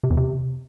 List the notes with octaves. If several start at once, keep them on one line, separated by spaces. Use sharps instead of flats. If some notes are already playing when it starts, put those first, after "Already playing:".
C3
E2
C3